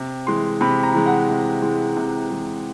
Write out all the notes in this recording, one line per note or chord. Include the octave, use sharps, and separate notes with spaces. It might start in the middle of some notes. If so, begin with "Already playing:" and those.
Already playing: C3
E3 G#3 C6
C3 B5
A#5
E3 G#3
F#5
C3
E3 G#3
C3
E3 G#3